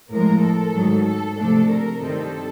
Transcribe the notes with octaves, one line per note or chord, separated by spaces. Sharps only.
A2 F3 G#3 A#4
A4
G#2 D#3 F#3
A4
C3 F3 A3 D4 A4
A#4
G2 D#3 G3 C4 A4